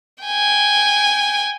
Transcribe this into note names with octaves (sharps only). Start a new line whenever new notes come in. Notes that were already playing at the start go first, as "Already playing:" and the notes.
G5 G#5